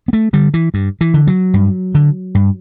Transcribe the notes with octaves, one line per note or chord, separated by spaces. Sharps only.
B3
A3
D3 G3
E3
G2
E3
D3
F#3
G2
D3
G2